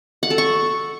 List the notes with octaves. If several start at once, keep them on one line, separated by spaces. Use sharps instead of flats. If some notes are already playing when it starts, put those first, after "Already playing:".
F#5
A4
C#6